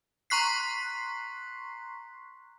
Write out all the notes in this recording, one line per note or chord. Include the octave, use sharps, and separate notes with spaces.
A#5 C6 C#6 F#6 B6 C7